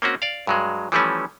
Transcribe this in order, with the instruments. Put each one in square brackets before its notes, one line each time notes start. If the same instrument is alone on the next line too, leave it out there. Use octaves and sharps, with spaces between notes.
[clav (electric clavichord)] A#3 C4 C#4 F#4
D5 F5
G2 F#3 G#3
E3 F3 G3 A3 C#4